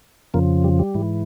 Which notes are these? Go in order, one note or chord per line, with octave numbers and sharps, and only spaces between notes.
F2 C#3 F3 A#3
G3
G3
G#2 E3